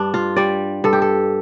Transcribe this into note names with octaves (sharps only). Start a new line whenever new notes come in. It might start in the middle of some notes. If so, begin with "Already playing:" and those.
Already playing: G2 D4
F4
G3 D5
G2 A4
G4
A4